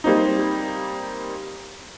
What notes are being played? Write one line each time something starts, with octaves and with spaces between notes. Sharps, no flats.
G3 A#3 C4 D#4